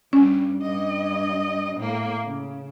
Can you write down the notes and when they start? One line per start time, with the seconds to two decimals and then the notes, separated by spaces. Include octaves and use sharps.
0.13 G2 G3 C#4
0.62 G2 D#5
1.76 A2 A#3
2.24 C#3